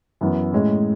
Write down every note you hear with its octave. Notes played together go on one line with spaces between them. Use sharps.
F#2 E3 B3
A2 G#3 C#4